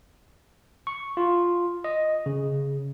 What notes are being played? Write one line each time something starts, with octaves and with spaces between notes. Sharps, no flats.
C#6
F4
D#5
C#3